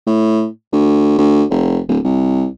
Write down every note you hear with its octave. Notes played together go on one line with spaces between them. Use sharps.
A2
D2
D2
F1
D1
C2